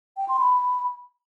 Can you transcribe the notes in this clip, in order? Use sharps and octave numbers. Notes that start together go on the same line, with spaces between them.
G5
C6
B5